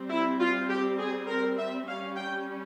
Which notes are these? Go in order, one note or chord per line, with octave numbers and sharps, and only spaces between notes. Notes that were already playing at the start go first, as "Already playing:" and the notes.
Already playing: G3 C4
E4
F4
G4
G#4
A#4
E5
G3 C#4 F5
G5